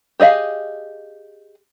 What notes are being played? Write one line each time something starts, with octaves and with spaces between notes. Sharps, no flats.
G4 G#4 D#5 F5